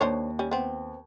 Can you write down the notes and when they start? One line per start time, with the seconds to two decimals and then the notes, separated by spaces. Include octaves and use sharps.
0.01 D#2 D4 C5 C#5
0.39 G3 C#4
0.51 B3 C4